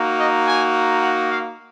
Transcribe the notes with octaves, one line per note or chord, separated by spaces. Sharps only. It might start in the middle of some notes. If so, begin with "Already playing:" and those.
Already playing: A#3 D#4 F#4
D#5
G#5
F#5
F5